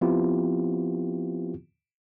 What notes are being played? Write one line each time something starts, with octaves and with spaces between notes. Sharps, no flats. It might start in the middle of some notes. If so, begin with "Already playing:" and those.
F3 B3 C4 E4 F4 G4